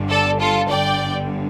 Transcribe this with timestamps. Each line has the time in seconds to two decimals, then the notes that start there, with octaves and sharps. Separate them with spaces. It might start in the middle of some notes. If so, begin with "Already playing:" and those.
Already playing: G1 G2 D3
0.09 A4 D5
0.39 F4 A4
0.69 G1 G2 D3 D5 G5